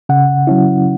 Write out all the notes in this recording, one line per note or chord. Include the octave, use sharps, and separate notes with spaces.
C#3 F#5
F#3 C#4 E4